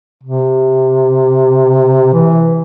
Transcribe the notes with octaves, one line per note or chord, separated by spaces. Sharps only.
C3
E3